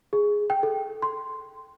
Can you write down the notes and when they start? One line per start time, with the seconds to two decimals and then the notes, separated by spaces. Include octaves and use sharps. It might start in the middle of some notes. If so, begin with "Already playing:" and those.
0.13 G#4
0.50 G5
0.63 A4
1.02 C6